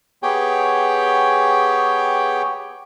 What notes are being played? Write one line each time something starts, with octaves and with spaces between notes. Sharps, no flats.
B3 G4 G#4 C#5 G5